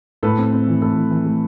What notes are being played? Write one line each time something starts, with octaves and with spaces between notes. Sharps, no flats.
A2 A4 B4
C4
C4
E3
A2 A4
E3
E3
A3